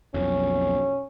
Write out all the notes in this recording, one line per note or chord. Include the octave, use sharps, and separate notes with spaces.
B1 F2 C#4